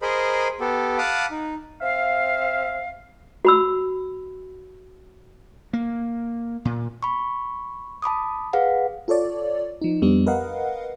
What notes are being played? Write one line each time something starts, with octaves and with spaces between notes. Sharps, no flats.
G#4 A#4 C5 D#5 B5
B3 G4 A4
F5 F#5 A5 B5 D6 D#6
D#4
C4 E5 F5
F#4 B5 E6
A#3
A#2
B5 C#6
A5 B5 D6 D#6
G#4 B4 F5 F#5
F4 A4 C#5 D5
F3 D#4
F2 G3 B3 D4
A#4 B4 D#5 F5 F#5